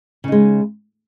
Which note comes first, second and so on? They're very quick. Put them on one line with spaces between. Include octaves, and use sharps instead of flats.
C#3 D#4 G#3